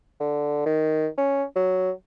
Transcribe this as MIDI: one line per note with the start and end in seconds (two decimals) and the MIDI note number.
0.20 0.66 50
0.66 1.07 51
1.18 1.43 61
1.56 1.91 54